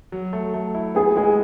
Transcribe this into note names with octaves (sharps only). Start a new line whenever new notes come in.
F#3
A3
A3
E4
B3 G#4
G#3 G#4